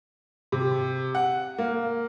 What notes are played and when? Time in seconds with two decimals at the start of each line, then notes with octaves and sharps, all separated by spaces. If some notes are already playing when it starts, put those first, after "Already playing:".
0.52 C3
1.15 F#5
1.58 A#3